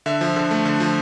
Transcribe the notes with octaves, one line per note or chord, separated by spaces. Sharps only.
D3 E5
F3
D3
A3
D3
F3